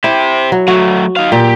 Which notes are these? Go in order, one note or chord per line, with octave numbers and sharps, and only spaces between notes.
E4 G4 C5
F#3
F#3 A3 F#4
D#4 F5
A#2 G4